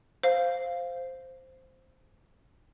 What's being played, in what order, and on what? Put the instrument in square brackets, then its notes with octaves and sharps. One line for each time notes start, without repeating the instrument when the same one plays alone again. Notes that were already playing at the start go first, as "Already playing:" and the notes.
[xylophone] C5 F5